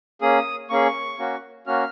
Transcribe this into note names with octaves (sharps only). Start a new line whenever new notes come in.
A#3 C#4 G#4 D#6
A#3 C#4 G#4 C#6
A#3 C#4 F#4
A#3 C#4 F#4 F6